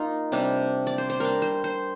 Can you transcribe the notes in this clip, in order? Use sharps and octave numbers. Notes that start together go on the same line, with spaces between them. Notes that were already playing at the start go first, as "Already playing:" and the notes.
Already playing: A#3 D#4 F4
C3 G3 D4
D5
C5
C5
G3 D4 A#4
C5
C5